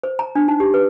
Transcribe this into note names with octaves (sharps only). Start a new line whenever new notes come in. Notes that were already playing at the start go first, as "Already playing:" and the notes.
C5
A#5
D4
D#4
G4
B4